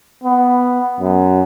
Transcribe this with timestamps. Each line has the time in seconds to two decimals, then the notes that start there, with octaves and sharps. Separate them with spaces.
0.24 B3
1.01 F#2